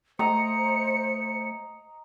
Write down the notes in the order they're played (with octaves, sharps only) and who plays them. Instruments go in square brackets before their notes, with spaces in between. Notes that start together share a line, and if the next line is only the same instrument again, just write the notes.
[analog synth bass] A3 [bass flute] C5 [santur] D#5 A#5 D#6 [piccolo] C#7